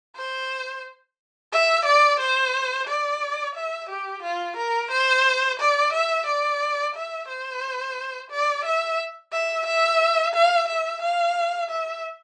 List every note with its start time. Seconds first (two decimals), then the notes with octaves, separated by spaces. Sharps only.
0.16 C5
1.52 E5
1.85 D5
2.20 C5
2.87 D5
3.55 E5
3.90 G4
4.23 F4
4.57 A#4
4.91 C5
5.60 D5
5.93 E5
6.26 D5
6.95 E5
7.28 C5
8.31 D5
8.65 E5
9.32 E5
9.66 E5
10.34 F5
10.68 E5
11.02 F5
11.70 E5